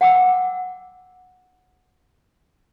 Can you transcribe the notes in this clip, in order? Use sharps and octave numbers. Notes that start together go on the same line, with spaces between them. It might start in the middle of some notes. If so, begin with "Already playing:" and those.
F#5 G5 D6 E6